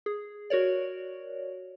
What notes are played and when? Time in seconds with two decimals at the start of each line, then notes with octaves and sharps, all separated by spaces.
0.06 G#4
0.50 F#4 A#4 C#5 D5